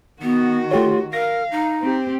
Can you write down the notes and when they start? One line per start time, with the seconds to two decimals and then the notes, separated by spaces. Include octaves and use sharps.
0.22 D#3 B3 F#4
0.71 A3 F4 G4 C#5
1.13 A#4 F5 A#6
1.51 D#4
1.82 C4 G4